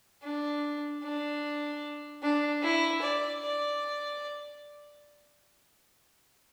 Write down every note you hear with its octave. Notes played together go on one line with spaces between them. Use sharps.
D4
D4
D4
E4
D5
D5